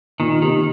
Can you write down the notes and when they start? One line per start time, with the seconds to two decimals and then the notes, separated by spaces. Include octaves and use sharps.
0.20 A#2 D#3
0.42 C3 D#3